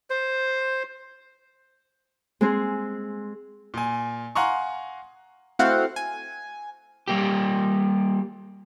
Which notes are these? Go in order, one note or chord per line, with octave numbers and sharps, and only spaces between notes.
C5
G#3 C4 G#4
A#2 G#5
F5 F#5 G#5 A#5 C6 C#6
A3 C4 E4 F#4 F5 F#5
G#5
G3 A#3 G4